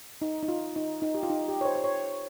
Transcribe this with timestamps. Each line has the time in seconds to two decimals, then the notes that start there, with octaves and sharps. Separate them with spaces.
0.22 D#4
0.43 D#4
0.48 F4
0.76 D#4
1.02 D#4
1.15 G4
1.23 F4
1.30 D#4
1.48 G4
1.61 C#5
1.65 C5
1.76 C5
1.84 C#5